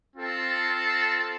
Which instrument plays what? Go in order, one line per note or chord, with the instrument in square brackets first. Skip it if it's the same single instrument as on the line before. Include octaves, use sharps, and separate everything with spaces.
[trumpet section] C4 F4 A4